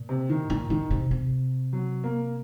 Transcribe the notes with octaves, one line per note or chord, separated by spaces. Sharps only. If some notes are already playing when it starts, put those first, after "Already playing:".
Already playing: A#2
C3
D#3
A#2 D#3
A#2 D#3
C3
C3
F#3
A#3